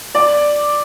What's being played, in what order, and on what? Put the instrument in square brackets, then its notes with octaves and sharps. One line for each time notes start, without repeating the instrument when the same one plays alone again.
[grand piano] D5